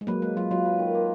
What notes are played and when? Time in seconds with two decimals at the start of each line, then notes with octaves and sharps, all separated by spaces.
0.01 G#3
0.07 F#3 A#3 B4
0.22 G#3 B4
0.37 F#3 F4
0.51 F#3 F4
0.65 B4
0.79 D#3
0.95 A#3